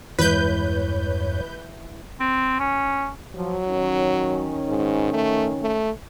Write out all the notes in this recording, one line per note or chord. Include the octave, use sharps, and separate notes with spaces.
E2 G2 E3 G#3 B4 C#5 G6
C4
C#4
F3 F#3
D#3 C#4
G#2
A3
A3